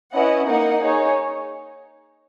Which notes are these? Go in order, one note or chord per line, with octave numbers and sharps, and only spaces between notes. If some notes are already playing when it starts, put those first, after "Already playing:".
C#4 E4 B4 D#5 F#5
A#3 D#4 A#4 D#5 F#5
D#4 G#4 C#5